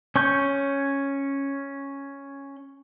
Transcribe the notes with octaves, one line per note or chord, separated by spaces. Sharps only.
C#4 C#6 G6